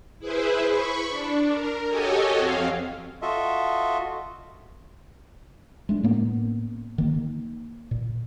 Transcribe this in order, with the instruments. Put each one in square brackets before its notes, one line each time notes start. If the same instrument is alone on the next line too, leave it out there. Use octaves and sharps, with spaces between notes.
[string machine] E4 G#4 B4 C5
B5 C#6
D4
A#4
F#4 G4 A4 C#5 D#5 G#5
F2 C4 F5
[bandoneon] F4 F#4 A4 D#5 E5
[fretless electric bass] G#3 A3 D4
A2 A#3 B3 C#4
D#3 A#3
A#2